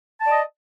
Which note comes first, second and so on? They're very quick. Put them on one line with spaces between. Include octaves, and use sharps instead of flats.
A5 D5 D#5